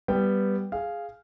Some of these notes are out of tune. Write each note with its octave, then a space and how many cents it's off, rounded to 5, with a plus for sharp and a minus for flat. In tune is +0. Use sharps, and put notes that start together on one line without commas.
G3 +0 B3 +0 G5 +0
G#4 +0 F5 -5